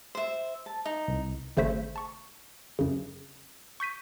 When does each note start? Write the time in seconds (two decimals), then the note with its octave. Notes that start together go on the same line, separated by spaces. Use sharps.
0.15 C5 E5
0.66 A5
0.86 D#4
1.08 C2
1.57 G#1 C#3 A3 C5 E5 B6
1.96 A5 C#6
2.79 F#2 C#3
3.80 C#6 G6 B6 D#7